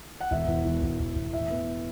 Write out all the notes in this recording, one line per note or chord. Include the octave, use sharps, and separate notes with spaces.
F#5
E1 E5
E2
E1
E1
E1
E1
A2 E5
B3